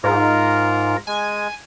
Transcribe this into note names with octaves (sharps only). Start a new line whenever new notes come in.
G#2 F4 A#4 A#5
G#3 G#5